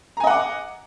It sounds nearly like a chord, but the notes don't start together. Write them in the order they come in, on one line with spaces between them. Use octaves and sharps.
A#5 G#5 D#5 F#5 D6